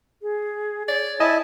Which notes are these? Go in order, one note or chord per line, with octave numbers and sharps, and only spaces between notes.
G#4
C#5 D5
E4 D#5 G#5 A5